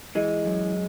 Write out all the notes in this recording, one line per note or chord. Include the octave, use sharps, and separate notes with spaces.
E3 G#3
F#2